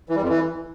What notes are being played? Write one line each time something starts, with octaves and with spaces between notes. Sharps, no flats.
E3
G3
F2
E3